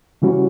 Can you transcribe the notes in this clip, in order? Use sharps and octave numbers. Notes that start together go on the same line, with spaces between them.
C#3 E3 G3 C#4 F#4